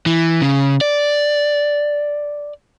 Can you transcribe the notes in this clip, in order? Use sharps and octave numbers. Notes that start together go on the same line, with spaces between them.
E3
C#3
D5